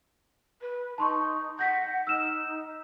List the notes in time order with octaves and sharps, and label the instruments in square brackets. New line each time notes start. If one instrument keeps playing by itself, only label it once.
[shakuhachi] B4
[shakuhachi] D#4 [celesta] A5 C6 C#6
[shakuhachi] F#5 [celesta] G6 A#6 B6
[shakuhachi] D#4 [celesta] E6 F6 E7